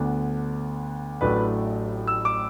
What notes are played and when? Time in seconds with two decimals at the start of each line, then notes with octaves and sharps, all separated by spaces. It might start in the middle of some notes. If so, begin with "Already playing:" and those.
Already playing: D2 D3 B3 D4
1.21 A1 A2 F#3 A3 D4 B4
2.07 E6
2.25 D6